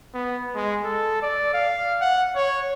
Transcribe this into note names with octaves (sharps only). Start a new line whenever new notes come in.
B3
G#3
A4
D5
F5
F#5
C#5